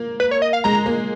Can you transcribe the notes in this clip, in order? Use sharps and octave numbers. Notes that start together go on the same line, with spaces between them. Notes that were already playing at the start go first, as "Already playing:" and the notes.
Already playing: A#3
B4
C#5
D#5
F5
G#3 A#5
A#3